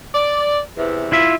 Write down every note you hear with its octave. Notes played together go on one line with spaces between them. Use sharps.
D5
E2 C3 E3
E4 F4 E5